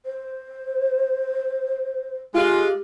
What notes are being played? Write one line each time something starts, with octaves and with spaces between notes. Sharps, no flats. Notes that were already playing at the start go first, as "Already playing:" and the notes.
C5
G#3 F4 G4